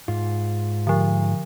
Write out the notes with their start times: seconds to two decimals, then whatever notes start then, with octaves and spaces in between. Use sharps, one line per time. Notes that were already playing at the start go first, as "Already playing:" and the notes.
0.08 G#2 F4
0.87 D3 F3